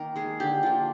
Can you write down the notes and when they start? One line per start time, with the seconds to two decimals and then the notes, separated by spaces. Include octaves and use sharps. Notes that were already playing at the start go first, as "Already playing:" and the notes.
Already playing: D#3 A#3 A#4
0.16 G#3 G#4
0.40 D3 G4
0.63 F3 A#3 F4